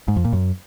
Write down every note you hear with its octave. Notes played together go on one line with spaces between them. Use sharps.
G#2
F2
A#2
F#2